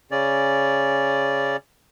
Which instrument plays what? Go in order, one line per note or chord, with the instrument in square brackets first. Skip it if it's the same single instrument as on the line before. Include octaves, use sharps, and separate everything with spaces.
[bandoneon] C#3 C#4 D5